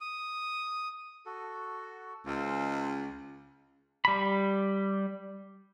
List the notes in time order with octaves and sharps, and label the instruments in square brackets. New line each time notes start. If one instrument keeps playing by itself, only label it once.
[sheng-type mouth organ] D#6
[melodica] F#4 A4
[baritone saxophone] C#2 [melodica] G#3 C5 F5
[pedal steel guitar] G3 B5